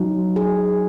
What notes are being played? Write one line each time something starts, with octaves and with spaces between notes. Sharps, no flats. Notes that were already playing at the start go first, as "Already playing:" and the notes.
Already playing: F#3 D#4
G#4